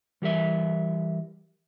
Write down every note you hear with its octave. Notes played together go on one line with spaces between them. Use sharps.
E3 G3 A#4 E5